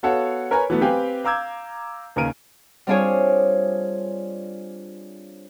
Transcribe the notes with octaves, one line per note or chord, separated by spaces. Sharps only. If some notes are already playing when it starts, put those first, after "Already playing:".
B3 F#4 A4 C#5 F5 F#5
A#4 B4 C#5 G#5 A#5
E3 F#3 A3 B3
C4 G4 B4 F5 G5 G#5
F5 A#5 D6 E6 G6 G#6
D#2 C#3 A#3 A#4 D7 D#7
G3 C4 D4 F4 G#4 C#5